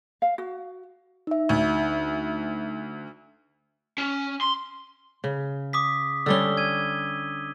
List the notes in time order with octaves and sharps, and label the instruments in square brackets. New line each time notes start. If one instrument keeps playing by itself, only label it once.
[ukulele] F5
F#4
[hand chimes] D#4 E5
[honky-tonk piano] D2
[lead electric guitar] C#4
C6
[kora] C#3
[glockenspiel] D6 D#6 B6
[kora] D3 G3 C#4 [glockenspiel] E6 G7
[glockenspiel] G#6 D#7